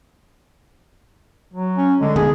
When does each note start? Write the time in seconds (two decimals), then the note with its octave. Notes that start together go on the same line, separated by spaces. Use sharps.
1.54 F#3
1.77 C#4
2.01 D3 G#3
2.16 D3 D#3 B3 G#4